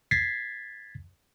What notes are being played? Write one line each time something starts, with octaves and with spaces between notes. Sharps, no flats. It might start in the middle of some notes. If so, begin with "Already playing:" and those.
G#6 A6 B6 C7